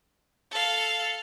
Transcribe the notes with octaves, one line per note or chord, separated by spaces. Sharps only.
A4 F5